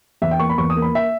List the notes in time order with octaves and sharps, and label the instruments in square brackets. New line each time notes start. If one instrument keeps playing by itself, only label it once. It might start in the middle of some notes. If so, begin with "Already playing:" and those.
[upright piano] E2 [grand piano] E5
[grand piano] G5
[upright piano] A#3 [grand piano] C#6
[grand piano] B5
[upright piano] E2 [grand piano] C#6
[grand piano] D#6
[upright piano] A#3
[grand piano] B5
E5